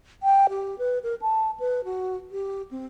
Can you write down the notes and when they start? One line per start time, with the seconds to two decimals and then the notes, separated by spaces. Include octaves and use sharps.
0.23 G5
0.49 G4
0.79 B4
1.04 A#4
1.22 A5
1.60 B4
1.84 F#4
2.31 G4
2.71 C4